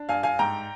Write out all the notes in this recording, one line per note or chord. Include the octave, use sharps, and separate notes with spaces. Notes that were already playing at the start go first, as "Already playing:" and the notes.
Already playing: D4
G2 F5 G#5
F5 G#5
G#2 G5 A#5